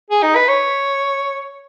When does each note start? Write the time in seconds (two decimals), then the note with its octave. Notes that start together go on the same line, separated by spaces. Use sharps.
0.10 G#4
0.23 D#4
0.35 B4
0.48 C#5